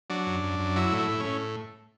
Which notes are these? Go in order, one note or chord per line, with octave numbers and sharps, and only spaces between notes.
F#3 D4
F#2
F#2
F#2
F#3 E4
A2
E4
A2
A2 C#4